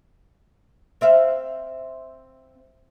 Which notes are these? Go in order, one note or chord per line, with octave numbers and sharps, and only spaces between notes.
C4 E5 F5